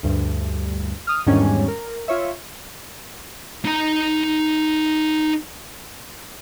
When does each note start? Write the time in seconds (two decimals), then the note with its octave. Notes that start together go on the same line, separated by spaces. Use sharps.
0.03 D2 G2
1.07 D#6 F6
1.26 E2 G#2 D#3 G3 C#4 D4
1.68 A#4
2.08 F4 C#5 E5
3.65 D#4 A#5